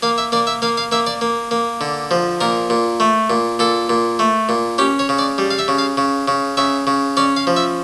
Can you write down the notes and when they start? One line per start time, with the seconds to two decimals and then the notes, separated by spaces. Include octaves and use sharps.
0.03 A#3 F5
0.18 E5
0.32 A#3 D5
0.47 E5
0.62 A#3 F5
0.77 F5
0.92 A#3 E5
1.07 D5
1.21 A#3
1.51 A#3
1.81 D3
2.11 F3
2.41 A#2 A#4
2.70 A#2
3.00 A3
3.30 A#2
3.59 A#2 A4
3.90 A#2
4.19 A3
4.49 A#2
4.78 C#4 G4
4.99 C#5
5.09 C#3
5.19 D5
5.38 G3
5.50 F5
5.59 E5
5.68 C#3
5.78 F5
5.97 C#3
6.28 C#3
6.57 C#3 E5
6.87 C#3
7.17 C#4 D5
7.36 F5
7.47 F3
7.56 E5